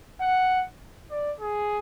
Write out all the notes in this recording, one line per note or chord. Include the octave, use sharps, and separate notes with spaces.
F#5
D5
G#4